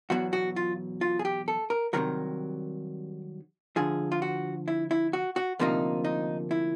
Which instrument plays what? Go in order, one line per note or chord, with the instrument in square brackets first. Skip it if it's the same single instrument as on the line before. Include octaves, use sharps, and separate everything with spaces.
[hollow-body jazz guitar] E2 B2 F#3 F#4
F#4
F4
F4
G#4
G4
A4
A#4
C2 C3 D#3 F#3 A#4
D2 D3 F3 G#4
F4
F#4
E4
E4
F#4
F#4
D2 C3 F3 A#3 D#4
D#4
E4